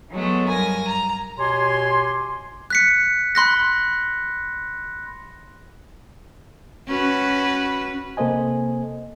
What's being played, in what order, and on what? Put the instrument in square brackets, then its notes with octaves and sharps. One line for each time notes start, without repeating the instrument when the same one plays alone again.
[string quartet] E3 F#3 G#3 A3 B3
G2 A#4 G#5 A#6
A#5
[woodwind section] B2 G4 C#5 G#5 C6
[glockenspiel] F#6 B6 C#7
B5 C6 F#6 A#6
[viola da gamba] C#4 F#4 B4
[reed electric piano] C3 A#3 A4 C5 D#5 G#5